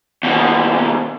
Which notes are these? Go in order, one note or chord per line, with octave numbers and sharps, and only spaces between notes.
D#2 B2